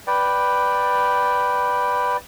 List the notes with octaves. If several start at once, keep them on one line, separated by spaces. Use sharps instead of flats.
B4 D5 G5